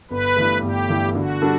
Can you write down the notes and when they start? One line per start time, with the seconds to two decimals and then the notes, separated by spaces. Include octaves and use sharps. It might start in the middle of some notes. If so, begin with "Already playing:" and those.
0.11 G1 B4
0.36 G2 E3 A3
0.62 G1 G4
0.89 G2 E3 A3
1.15 D3 F#4
1.42 G3 D4 A4